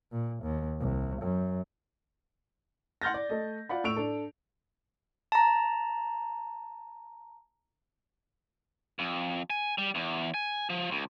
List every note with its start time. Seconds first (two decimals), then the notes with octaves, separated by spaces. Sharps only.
0.12 A#2
0.43 D#2
0.80 C2
1.22 F#2
3.02 F#5 C6 F6 G6 A6 A#6
3.14 D5
3.30 A3 A4 D#5
3.69 F4 D5 F#5 B5
3.84 A2 C#6 E6 D7 F7
3.97 D4 A4
5.32 A5 A#5
8.99 F2
9.50 G#5
9.78 G3
9.95 E2
10.34 G#5
10.70 F3
10.91 C#2